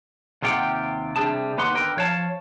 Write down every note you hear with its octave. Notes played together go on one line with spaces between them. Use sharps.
D#2 C3 F4 G4 F#5 G5
C3 G3 D4 G#4 A5
D#2 B3 G4 B4 F#5 C6
D3 A#4 B4 G5
F3 C#5 F5 A5